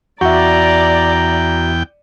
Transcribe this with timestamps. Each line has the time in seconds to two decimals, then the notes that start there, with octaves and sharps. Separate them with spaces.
0.21 E2 F#4 D5 E5 G5 A#5